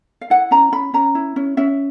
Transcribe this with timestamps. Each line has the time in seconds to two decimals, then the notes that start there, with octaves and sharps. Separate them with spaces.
0.21 F5
0.30 E4 F#5
0.51 C#4 A#5
0.72 C#4 B5
0.94 C#4 A#5
1.15 E4
1.36 C#4
1.57 C#4 E5